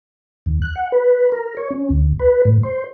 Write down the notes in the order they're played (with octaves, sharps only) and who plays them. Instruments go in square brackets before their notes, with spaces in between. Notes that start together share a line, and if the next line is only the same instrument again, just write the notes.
[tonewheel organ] D#2
F#6
F#5
B4
A#4
C#5
C#4
D2
B4
A2
C5